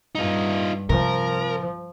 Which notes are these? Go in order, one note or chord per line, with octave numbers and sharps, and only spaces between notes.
G2 D#4 F4
C3 F3 A#4